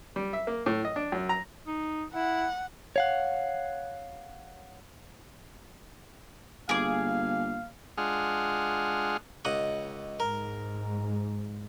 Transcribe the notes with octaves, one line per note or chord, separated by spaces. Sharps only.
G3
E5
A#3
A2
D#5
D4
F#2
A#5
D#4
E4 F#5
C#5 F5 F#5
G1 A#3 G#4 F5 D6
G#3 D4 F4 G#4 F#5 F6
C#2 D#5 F#5
G#2 A#4